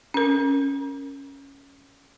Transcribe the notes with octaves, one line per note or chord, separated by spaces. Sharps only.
C#4 A#4